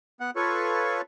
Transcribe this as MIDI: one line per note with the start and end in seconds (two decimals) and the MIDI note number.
0.20 0.31 59
0.20 0.31 78
0.36 1.01 65
0.36 1.01 69
0.36 1.01 71
0.36 1.01 73
0.36 1.01 85